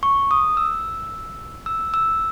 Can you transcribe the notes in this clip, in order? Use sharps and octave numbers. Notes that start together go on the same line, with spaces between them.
C#6
D#6
E6
E6
E6